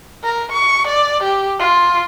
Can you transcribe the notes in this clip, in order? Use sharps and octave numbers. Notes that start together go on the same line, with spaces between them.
A#4
C#6
D5
G4
F4